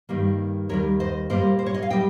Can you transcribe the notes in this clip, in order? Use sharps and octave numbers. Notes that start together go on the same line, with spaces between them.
G2 D#3 G3 A#3
D#2 D#3 G3 A#4 C#5
C5 D#5
A#2 G3 A#3 C5 D#5
C5
C#5
D#5
F5
G3 D#5 G5